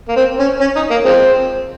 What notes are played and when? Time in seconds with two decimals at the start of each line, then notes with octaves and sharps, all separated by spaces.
0.08 A#3
0.16 C4
0.39 C#4
0.61 C#4
0.76 D#4
0.90 A#3
1.05 F3 G#3 C4